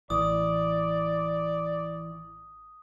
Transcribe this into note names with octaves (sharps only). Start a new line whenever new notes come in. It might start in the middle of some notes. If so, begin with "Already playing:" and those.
A1 E3 D5 D#6